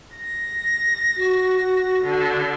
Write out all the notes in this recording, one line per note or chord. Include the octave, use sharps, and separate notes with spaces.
A#6
F#4
D3